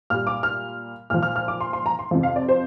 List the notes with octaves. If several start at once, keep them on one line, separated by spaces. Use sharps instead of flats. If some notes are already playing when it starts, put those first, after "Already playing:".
A#2 G3 F6
D6
F6
A#2 F3 F6
F6
F6
D6
C6
C6
A#5
C6
F2 C3 F3
F5
D5
C5